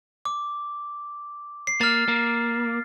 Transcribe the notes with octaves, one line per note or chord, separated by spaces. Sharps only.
D6
C7
A#3 F6 A6
A#3